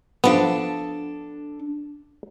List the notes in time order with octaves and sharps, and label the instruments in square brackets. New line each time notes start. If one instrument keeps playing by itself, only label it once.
[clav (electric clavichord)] F3 B3 [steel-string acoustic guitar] D4 A4 A5